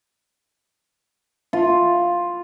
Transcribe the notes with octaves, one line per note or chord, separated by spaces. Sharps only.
F4